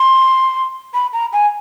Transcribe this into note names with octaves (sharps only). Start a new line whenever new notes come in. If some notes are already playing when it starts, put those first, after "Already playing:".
Already playing: C6
B5
A#5
G#5